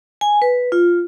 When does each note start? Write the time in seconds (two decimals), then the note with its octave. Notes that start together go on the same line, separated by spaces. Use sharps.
0.21 G#5
0.42 B4
0.72 F4